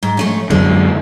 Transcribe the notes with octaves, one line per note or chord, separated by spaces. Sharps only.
G#2
F3 A3 C#4
F#2 D3 G#3